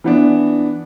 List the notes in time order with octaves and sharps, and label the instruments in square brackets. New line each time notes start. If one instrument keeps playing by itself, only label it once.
[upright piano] E3 B3 D4